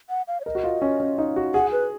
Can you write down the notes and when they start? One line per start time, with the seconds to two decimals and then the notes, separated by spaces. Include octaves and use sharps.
0.10 F#5
0.28 F5
0.40 C#5
0.46 A#4 D#5
0.55 F#4
0.64 F4
0.82 C#4
1.00 C#4
1.18 D#4
1.36 F#4
1.54 G#4 F#5
1.72 B4